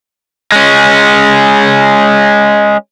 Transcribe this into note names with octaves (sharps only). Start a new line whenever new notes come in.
G#3 C#4